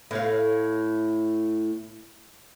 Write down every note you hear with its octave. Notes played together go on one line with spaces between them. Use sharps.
A2 C#5 F5